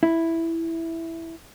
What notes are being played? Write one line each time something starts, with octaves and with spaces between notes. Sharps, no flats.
E4